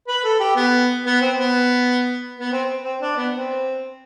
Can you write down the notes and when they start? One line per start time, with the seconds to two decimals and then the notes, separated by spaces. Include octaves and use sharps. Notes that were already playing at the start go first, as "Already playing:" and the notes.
0.07 B4
0.24 A4
0.40 G4
0.56 B3
1.05 B3
1.21 C4
1.38 B3
2.39 B3
2.52 C4
2.84 C4
3.01 D4
3.17 B3
3.33 C4